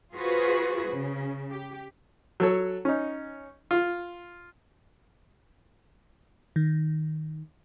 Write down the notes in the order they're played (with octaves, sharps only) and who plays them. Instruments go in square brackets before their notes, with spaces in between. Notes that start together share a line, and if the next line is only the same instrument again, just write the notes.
[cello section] F4 F#4 G#4 B4 C5
C#3
G4
[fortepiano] F#3 A4 C#5
C#4 D#4
F4
[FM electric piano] D#3